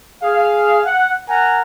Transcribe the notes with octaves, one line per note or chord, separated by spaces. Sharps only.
G#4 F5
F#5
A#4 F#5 G#5 A#5